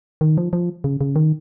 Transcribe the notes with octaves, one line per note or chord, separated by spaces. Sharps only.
D#3
F3
F3
C#3
C#3
D#3